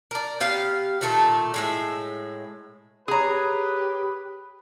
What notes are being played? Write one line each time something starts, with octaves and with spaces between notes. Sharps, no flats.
A#4 D5
B3 G4 F5
A#2 D#3 A3 A4
A2 G#3 E5
G4 G#4 B4 C#5 A#5 D#6